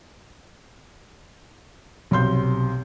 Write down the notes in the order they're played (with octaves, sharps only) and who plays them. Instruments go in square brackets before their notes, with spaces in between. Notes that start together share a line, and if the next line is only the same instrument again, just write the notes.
[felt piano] B1 C3 C6 G6